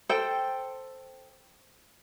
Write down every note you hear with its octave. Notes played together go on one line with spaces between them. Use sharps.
A4 C5 G5